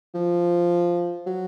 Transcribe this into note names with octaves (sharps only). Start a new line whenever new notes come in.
F3
F#3